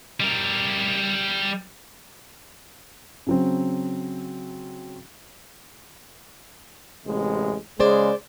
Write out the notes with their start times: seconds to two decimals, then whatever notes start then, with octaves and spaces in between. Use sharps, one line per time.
0.20 G3 A#4
3.27 C#3 F#3 C4
7.06 A1 C3 G#3
7.80 C#3 G#3 G#4 C5 D5